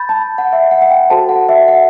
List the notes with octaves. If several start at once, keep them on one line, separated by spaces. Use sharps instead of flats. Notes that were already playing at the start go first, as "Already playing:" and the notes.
Already playing: B5 G6 A6
A5
F#5
E5
F#5
F#5
G5
F#4 A4 C5 A5
F#5
E5
F#5